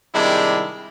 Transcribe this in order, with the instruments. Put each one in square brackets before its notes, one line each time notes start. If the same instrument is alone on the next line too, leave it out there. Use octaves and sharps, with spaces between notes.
[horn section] C3 D#3 G3 G#3 D4 E4